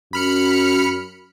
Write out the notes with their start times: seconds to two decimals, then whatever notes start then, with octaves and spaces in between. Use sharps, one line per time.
0.13 F#2 B5 F6 C#7